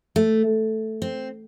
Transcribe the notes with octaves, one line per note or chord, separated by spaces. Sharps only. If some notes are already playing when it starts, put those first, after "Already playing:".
A3
C4